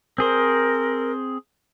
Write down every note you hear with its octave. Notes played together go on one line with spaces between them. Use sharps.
C4 G#4 A#4 C5